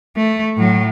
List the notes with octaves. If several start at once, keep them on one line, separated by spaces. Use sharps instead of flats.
A3
A2 F#3